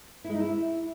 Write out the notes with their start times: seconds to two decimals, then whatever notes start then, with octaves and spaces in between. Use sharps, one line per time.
0.24 E4
0.30 G#3
0.35 D#4
0.40 E4